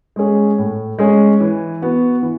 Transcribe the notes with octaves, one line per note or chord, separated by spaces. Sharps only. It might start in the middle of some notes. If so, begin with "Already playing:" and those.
G#3 C#4 G#4
A2
G#3 C#4 G#4
E3
B3 F#4
E3